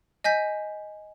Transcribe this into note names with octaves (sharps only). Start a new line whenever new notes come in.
D#5 G#5 G6 B6